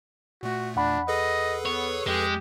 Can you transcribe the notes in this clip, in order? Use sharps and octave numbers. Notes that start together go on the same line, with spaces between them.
A#2 A3 F#4
E2 D4 F#5 B5
G#4 A4 B4 D#5
B3 C#5
F2 G#3 G4